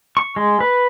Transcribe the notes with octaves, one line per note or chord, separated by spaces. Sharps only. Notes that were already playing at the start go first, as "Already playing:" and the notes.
C#6
G#3
B4